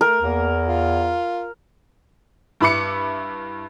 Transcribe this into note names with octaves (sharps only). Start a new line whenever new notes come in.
A3 A#4
E2 A#3
F4
G2 E4 B5 D6 C#7